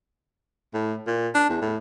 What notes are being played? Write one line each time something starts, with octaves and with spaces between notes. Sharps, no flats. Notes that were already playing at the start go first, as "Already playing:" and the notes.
A2
A#2
D4
E2
A2